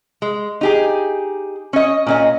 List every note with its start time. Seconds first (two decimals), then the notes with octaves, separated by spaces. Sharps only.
0.22 G#3
0.61 D#4 G4 G#4
1.73 C#4 D#5
2.07 A#2 C#4 D#5